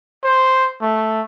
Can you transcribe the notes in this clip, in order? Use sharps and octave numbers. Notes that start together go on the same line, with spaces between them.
C5
A3